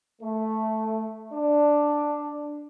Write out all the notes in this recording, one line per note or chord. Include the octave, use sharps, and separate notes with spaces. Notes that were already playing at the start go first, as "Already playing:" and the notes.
A3
D4